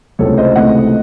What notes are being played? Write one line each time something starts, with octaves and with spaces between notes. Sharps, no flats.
C#2 C3 E3 A3 A4 C#5
C5 D#5
C#2 C3 E3 A3 D#5 F#5